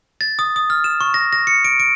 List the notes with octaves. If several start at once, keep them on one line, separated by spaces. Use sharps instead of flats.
A6
D#6
D#6
F6
E7
C#6
A#6
A#6
C#7
D7
D7